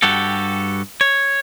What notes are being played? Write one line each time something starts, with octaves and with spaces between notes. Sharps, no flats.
G2 F#4 G4 A4
C#5